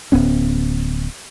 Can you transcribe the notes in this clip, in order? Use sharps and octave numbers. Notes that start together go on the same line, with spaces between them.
D1 B3 C#4